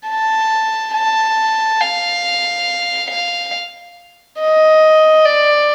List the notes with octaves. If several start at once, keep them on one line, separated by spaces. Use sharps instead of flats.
A5
A5
F5
F5
D#5
D5